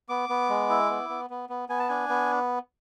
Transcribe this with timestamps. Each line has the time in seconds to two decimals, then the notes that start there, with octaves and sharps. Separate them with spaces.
0.09 B3 D6
0.29 B3
0.49 G#3
0.70 E4
0.89 B3
1.09 B3
1.30 B3
1.49 B3
1.69 B3 G#5
1.79 A5
1.89 D4 G#5
2.09 B3